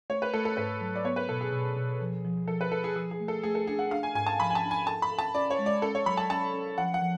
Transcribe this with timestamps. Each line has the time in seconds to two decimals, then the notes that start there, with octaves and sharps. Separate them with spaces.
0.10 A3 C#5
0.22 B4
0.34 A3 A4
0.45 A4
0.57 G#2 B4
0.81 F#3
0.95 D5
1.05 B3 C#5
1.16 B4
1.29 B2 A4
1.41 G#4
1.53 B2
1.77 B2
2.01 F3
2.25 F3
2.48 F3 A4
2.61 B4
2.72 A4 B4
2.84 G#4
2.96 F3 G#4
3.11 G#4
3.20 A3
3.28 A4
3.43 A3 G#4
3.55 A4
3.67 D4 G#4
3.79 F#5
3.91 D4 F5
4.03 G#5
4.15 G#2 G#5
4.27 A5
4.39 F3 B5
4.50 G#5
4.55 A5
4.63 D4
4.71 G#5
4.86 A4 A5
5.02 B5
5.11 A4
5.19 A5
5.34 C#4 D5
5.50 C#5
5.59 G#3
5.66 D5
5.82 C#4 A4
5.95 C#5
6.06 F#3 B5
6.17 A5
6.30 C#4 A5
6.53 C#4
6.78 F3 F#5
6.94 F#5
7.02 F3